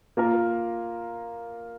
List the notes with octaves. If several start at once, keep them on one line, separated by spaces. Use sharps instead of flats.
A#3 F4 A#4